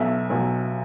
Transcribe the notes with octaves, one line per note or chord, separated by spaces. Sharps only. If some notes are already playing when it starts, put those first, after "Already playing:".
Already playing: B1 B2 F#3 E5
B1 B2 F#3